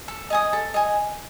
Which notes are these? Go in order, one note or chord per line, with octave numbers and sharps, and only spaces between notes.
A4
D#5 G#5 D#6
A4
D#5 G#5